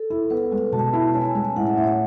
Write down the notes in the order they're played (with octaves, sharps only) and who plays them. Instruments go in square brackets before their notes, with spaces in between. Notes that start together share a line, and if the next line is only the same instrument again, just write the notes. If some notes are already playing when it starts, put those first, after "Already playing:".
Already playing: [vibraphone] A4
[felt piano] E4
[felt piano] B3 [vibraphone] B4
[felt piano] G#3
[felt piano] B2 [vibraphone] A5
[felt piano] E4
[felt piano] C#4 [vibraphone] G#5
[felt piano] G#3
[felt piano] A2 [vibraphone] F#5
[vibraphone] E5
[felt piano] A2
[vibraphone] C#5